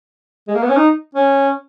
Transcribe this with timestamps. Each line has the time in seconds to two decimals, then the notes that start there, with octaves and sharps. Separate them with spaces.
0.48 G#3
0.55 A#3
0.63 B3
0.70 C#4
0.77 D#4
1.15 C#4